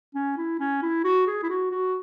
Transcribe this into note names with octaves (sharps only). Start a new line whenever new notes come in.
C#4
E4
C#4
E4
F#4
G#4
E4
F#4
F#4